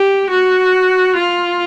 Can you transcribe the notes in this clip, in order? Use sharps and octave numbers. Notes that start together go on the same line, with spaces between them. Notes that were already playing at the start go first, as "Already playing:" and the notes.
Already playing: G4
F#4
F4